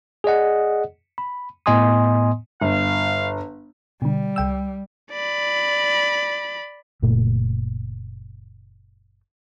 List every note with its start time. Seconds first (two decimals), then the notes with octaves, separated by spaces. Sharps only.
0.24 G#4 D5 D#5 F#5
1.18 B5
1.66 A2 B3 D#5 G#5 C6 D#6
2.62 G1 F5
4.02 B2 D3 G3
4.36 C2 G5 E6
5.12 D5 B5
7.02 F#1 A#2 A3